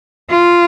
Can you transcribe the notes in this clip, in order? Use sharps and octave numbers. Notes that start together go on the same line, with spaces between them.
F4